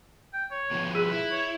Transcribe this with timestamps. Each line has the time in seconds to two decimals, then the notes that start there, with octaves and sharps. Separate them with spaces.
0.33 G5
0.51 C#5
0.71 B2 F3 B3
0.95 G#4 B4
1.12 E4
1.31 C#5